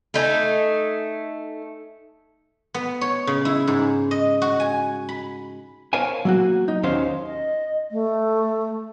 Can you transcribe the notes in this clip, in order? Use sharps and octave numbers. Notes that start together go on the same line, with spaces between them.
A3 D#4 G#5
B3
C#5
C#3
E4
G#2
D#5
F#4
G#5
B5
A#4 C5 C#5 F5 G#5
F#3 A#3 F#4
D#4
D#2 D#3 C#4 C5 F5
D#5
A3